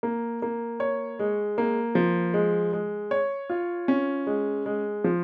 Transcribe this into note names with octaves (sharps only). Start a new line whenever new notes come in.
A#3
A#3
C#5
G#3
A#3
F3
G#3
G#3
C#5
F4
C#4
G#3
G#3
F3